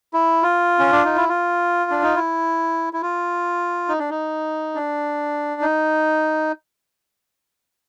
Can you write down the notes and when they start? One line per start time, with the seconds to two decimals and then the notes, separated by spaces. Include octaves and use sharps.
0.14 E4
0.43 F4
0.79 C#4
0.92 D4
1.05 D#4
1.17 E4
1.29 F4
1.91 D4
2.03 D#4
2.16 E4
2.93 E4
3.02 F4
3.89 D#4
3.99 D4
4.10 D#4
4.75 D4
5.61 D#4